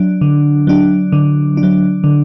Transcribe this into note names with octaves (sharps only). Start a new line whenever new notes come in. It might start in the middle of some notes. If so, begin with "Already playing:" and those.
Already playing: F#3 D4
D3
F#3 D4
D3
D4
F#3
D3